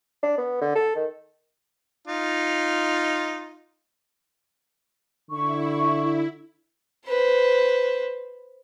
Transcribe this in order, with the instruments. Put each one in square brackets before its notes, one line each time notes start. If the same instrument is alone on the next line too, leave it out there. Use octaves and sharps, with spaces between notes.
[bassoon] D4
B3
D3
A4
D#3
[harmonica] D#4 F4
[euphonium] D3 [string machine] E4 [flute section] C#6
[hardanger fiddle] B4 C5